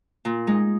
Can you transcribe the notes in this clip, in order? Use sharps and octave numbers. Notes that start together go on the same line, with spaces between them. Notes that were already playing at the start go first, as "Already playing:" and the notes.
A#2
G#3 D#4